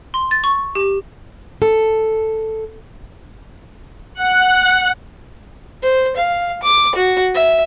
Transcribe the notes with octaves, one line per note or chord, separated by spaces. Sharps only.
C6
A6
C#6
G4
A4
F#5
C5
F5
D6
F#4
E5